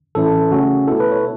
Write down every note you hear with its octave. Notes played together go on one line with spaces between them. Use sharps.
A2 E3 C#4 E4 A4
C#3 A3 C#4 F#4
B2 B3 E4 A4
B4
C#5